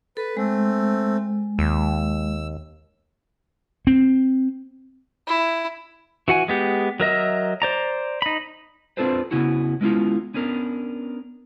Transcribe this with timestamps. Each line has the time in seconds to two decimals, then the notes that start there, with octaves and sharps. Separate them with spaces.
0.17 A4 B4
0.37 G#3 A3 C4
1.59 D#2 E6
3.87 C4
5.27 E4
6.28 E3 F#4 F#5 G#5
6.48 G#3 B3 G4
7.00 F#3 A#4 D#5 E5
7.62 C5 D5 A#5
8.22 D#4 B5
8.97 C4 D4 F4 A4 B4 C5
9.31 C#3 B3 C#4 E4 F#4
9.81 G#3 B3 C#4 E4 F4
10.34 B3 C#4 D4 A#4